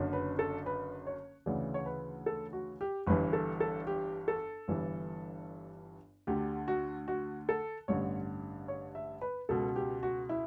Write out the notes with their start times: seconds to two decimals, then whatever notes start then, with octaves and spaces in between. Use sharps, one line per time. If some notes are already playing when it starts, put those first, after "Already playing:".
Already playing: F#1 F#2 D3
0.13 B4
0.39 A4
0.66 B4
1.07 C#5
1.46 D2 C#3 E3 D5
1.74 C#5
1.86 B4
2.26 A4
2.53 F#4
2.81 G4
3.07 G1 G2 E3 B4
3.33 A4
3.60 A4
3.87 G4
4.28 A4
4.68 G1 G2 E3
6.27 D2 D3 G4
6.68 F#4
7.08 F#4
7.49 A4
7.88 A1 G2 D3 C#5
8.68 C#5
8.95 E5
9.21 B4
9.49 C#2 B2 A4
9.76 G4
10.03 F#4
10.29 E4